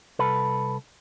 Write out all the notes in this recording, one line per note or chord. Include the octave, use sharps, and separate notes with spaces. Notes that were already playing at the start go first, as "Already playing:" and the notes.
C2 A4 B4